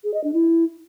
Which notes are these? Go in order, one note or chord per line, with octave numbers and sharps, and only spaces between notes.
G#4
D#5
D4
E4